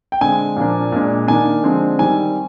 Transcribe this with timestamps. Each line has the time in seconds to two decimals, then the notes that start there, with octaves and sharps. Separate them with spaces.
0.12 G5
0.21 D3 G#3 C4 G#5
0.56 A#2 F3 A#3 D4
0.92 A#2 G#3 D4
1.27 D#3 A#3 D4 G#5
1.63 D3 F3 G#3 C4
1.99 D#3 G3 C4 G#5